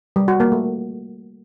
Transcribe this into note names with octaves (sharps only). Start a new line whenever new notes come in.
G3
F#4
A#3
A3